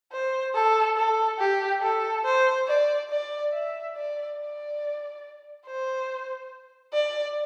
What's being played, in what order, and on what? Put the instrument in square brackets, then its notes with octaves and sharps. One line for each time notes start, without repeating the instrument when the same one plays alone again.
[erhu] C5
A4
A4
G4
A4
C5
D5
D5
E5
D5
D5
C5
D5